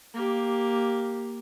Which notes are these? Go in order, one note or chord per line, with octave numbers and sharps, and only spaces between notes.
A#3 G4